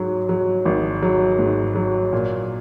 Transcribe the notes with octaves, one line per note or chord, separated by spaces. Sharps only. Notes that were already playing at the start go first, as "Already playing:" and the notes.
Already playing: G#2 F#3
F#3
G#1
F#3
G#2
F#3
A#2